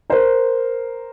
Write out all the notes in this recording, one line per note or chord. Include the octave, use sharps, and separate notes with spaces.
A#4 C5